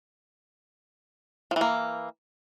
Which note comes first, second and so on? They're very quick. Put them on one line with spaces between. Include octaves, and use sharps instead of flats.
F3 E3 A#3